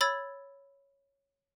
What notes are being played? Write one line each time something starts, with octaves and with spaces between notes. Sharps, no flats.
C#5 B5 E6 G#6 A6